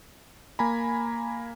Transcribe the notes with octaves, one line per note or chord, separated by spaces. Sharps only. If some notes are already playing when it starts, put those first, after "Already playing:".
A#3 G#5 A#5 B5